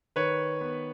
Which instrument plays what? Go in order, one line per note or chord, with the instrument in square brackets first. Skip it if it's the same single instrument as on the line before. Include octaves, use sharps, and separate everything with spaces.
[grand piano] D#3 B4 C#5
B3